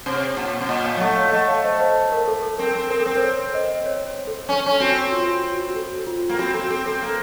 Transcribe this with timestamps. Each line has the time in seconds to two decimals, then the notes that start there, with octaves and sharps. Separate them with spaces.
0.06 C3 C5
0.16 C#5
0.25 C5
0.37 A#2 C#5 F5
0.61 C3
0.69 A#2 D#5 F#5
0.85 C#5 F5
0.96 F#3
1.00 A3 D#5 F#5
1.16 C#5 F5
1.32 A3 D#5 F#5
1.48 C#5 F5
1.64 C5 D#5
1.79 C5 D#5
1.95 C5
2.12 A#4
2.28 A4
2.43 A4
2.58 C4 A#4
2.75 C4
2.90 C4 A#4
3.00 A4
3.06 C4 A#4
3.17 C5
3.22 C#5
3.54 C5 D#5
3.86 C#5
4.27 A4
4.49 C#4 A4
4.66 C#4
4.80 C4 F#4
5.12 F4
5.28 F#4
5.44 F4
5.60 F#4
5.70 F#4
5.75 A4
6.07 F4
6.29 A#3
6.39 C4 F#4
6.54 C4 A4
6.70 C4 A4
6.86 C4 A4
7.02 A#3